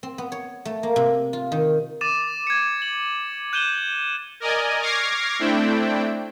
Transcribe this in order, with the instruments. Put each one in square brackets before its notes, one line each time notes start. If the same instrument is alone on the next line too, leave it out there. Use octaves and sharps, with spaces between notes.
[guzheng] C4
B3
C#5
A3
A#3
C3
F4
D#3
[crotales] D6 A6 D#7 E7
G#6 C#7
F#7
F#6 G6 D#7 E7 F#7 G7
[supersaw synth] A#4 D5 D#5 G#5
C#6 D6 F6 G#6 A#6 C7
A3 C4 D4 E4 G5